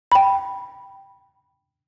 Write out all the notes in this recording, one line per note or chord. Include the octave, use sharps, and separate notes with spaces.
G5 B5